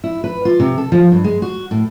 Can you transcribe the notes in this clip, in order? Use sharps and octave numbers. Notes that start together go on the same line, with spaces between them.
E4
B4
F4
C3
A4
F3
G2
G#3
F#4
A2